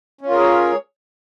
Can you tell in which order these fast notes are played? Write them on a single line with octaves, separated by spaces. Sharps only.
C#4 F4 A#4 G#4 C#5